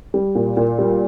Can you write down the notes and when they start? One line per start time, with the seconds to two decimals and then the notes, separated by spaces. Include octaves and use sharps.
0.14 G3
0.35 A#2
0.57 A#2
0.79 G3